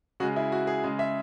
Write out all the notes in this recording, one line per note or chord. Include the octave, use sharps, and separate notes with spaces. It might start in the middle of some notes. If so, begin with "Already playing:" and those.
C#3 G#3 F#4
E4
F#4
G#4
C#3 G#3
E5